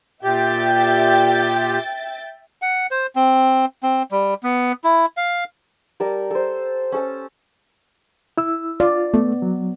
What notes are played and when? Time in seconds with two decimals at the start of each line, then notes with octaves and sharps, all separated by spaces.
0.24 A#2 G4 E5 G5 A6
2.62 F#5
2.91 C5
3.16 C4
3.83 C4
4.11 G3
4.43 B3
4.84 E4
5.17 F5
6.00 G3 A#4 A5
6.31 A4 C5
6.92 C#4 A4 A5
8.38 E4 E6
8.80 F4 D5
9.14 A3 B3
9.42 F#3